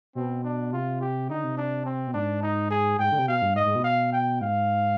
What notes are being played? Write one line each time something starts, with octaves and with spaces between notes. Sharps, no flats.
B2 C4
D4
C3 F4
G4
D3 D#4
C3
D4
C4
B2
G#2 D4
D#4
G#4
G#2 G5
D3
C3
B2 F5
G2
G#2 D#5
G#2
B2
F5
G5
G#2 F5